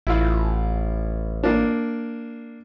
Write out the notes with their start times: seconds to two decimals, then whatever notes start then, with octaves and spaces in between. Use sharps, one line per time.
0.07 A1 E4 F4
1.43 A#3 D4